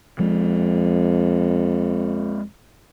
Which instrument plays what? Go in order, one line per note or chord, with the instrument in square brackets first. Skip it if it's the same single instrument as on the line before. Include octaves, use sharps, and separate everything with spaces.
[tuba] F2 [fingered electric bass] F3 G#3